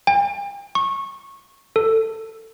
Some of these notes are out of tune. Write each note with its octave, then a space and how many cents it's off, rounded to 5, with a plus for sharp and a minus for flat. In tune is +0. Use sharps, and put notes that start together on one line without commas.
G5 +45
C#6 -20
A4 +20